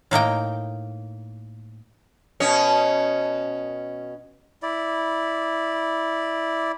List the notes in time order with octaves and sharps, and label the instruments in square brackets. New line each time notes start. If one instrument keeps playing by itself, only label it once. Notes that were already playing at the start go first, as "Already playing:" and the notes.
[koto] A2 A#3 D#4 G5
[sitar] B2 C#4
[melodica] E4 D5